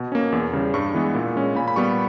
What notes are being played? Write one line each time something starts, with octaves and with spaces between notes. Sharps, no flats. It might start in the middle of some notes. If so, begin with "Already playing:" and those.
Already playing: B2
A#3 C#4
E2
C#3 G3
G2 C#6
E3 G#3 B3
A#2
G#3 C#4
A#2 B5
B5
G3 B3 C#6